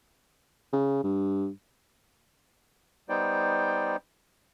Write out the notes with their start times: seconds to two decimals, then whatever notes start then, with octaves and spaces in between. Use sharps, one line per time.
0.73 C#3
1.04 G2
3.09 G3 B3 D#4 C5 D5 G5